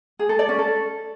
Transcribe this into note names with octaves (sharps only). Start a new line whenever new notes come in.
G#4
A4
D5
C#4
A4